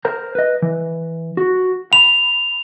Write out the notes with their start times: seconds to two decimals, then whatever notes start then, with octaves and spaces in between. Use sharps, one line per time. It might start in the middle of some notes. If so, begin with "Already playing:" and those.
0.05 A#4 C5 A#5
0.35 B4 D#5
0.62 E3
1.37 F#4
1.93 B5 F7